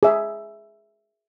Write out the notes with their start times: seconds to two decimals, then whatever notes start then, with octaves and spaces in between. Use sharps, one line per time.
0.03 G#4 E5